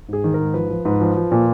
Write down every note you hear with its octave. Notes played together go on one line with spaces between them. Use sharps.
G#2 G#4
D#3
A#4
G#2
F3 B4
F3
G#2 B4
F3
F3
A#2